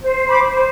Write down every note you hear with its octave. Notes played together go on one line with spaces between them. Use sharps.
C5
B5 D6
C5